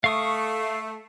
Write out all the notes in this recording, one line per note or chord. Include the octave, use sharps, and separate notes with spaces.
A3 F5 C#6 D#6